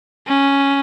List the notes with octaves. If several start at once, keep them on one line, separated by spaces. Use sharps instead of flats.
C#4